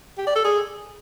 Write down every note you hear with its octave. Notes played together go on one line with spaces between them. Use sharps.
G4
D5
A4
G#4